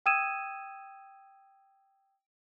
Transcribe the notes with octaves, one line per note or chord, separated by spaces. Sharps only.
G5 D#6 E6 G#6 D#7 E7